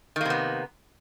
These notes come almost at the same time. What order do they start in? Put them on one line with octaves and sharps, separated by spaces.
D#3 A#3 C3 B3